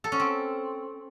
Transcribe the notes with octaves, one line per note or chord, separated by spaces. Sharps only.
A4
C#4
C4